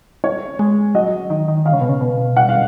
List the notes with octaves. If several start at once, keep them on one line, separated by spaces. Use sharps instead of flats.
C#5
G#3
F#3 D#5
D#3
D#3
D#3 F5
C#3
B2
C#3
B2
F#5
F5